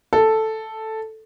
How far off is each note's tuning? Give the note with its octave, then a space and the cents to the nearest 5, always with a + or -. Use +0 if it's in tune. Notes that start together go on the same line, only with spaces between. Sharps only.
A4 +0